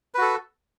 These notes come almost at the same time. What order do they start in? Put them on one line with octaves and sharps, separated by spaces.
B4 F#4 A4